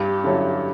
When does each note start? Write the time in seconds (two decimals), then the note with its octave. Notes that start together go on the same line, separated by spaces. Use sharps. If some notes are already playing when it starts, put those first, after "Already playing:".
Already playing: G2 G4
0.24 D3 F#3 C#4 E4